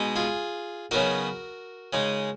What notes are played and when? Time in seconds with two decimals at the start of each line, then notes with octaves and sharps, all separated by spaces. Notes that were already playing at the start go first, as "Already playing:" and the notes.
Already playing: B2 G#3 D#4
0.16 F4 G#4
0.91 C#3 F#3 B3 D#4 F#4 A#4
1.93 C#3 G#3 D#4